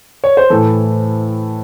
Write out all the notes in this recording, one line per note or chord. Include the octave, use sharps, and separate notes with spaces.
C#5
C5
A2 E3 A4